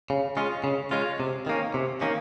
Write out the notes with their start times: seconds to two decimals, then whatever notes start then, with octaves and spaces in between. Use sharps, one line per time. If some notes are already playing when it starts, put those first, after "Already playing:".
0.10 C#3
0.37 G#3 C#4 F4
0.64 C#3
0.91 G#3 C#4 F4
1.20 C3
1.46 D#3 A#3 C#4
1.74 C3
2.01 D#3 A#3 C#4